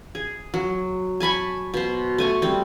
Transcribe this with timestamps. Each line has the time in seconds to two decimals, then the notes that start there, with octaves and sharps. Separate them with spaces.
0.15 G#4
0.54 F#3
1.20 G#5 A5 B5 C#6
1.74 B2 C5
2.18 A3 G#5 C#6
2.42 G3 C4